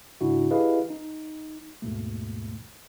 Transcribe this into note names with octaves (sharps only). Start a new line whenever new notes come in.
G#2 C#3 D4 E4 F#4
E4 G4 G#4 B4 D#5 F5
D#4
D#2 G#2 B2 A3